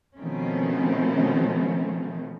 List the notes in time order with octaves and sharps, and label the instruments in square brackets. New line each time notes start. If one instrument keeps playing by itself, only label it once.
[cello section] B2 D#3 F3 A3 C4 C#4